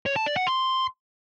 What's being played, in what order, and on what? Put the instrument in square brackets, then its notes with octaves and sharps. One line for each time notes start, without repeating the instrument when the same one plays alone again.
[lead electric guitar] C#5
A5
D5
F#5
C6